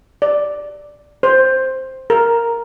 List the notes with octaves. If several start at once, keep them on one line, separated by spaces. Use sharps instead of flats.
D5
C5
A#4